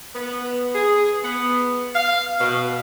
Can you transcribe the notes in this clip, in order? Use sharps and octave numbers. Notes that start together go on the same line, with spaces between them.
B3
G#4
B3
F5
B2